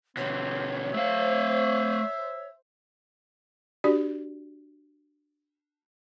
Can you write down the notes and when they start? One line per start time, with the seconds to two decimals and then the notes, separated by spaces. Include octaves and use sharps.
0.17 B2 D3 C4 C#5
0.94 A3 C5 E5 F5
3.84 D4 F#4 G4 D5